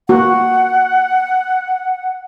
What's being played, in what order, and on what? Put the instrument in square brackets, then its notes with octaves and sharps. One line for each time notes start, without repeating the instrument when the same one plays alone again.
[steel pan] A#3 F#4 [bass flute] F#5